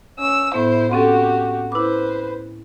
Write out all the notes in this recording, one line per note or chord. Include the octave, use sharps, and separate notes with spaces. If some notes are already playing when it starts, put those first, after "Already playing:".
C#4 E6
A2 B3 E4 C5
C4 C#4 F#4 G4 A4
E4 B4 C5 D6